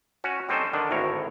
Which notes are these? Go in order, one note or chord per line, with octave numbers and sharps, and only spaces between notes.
C#4 F#4
G3 C4 C#4 D#4 A4 C5
D3 D#3 D4
G#1 D2 A2 A#4 C#5